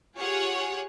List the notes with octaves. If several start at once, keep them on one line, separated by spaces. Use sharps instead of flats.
F4 G4 G#4 C#5 F#5